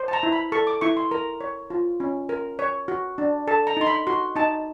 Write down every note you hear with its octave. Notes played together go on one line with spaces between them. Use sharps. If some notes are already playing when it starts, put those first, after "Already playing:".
Already playing: C5
A5
A#5
E4
B5
A4 C#6
D6
E4 C#6
C6
A#4 A#5
C#5
F4
C#4
A#4
C#5
F#4
D4
A4 A5
A#5
D#4 C6
B5
F#4 C6
D#4 A5